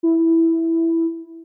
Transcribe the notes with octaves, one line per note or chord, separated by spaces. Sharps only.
E4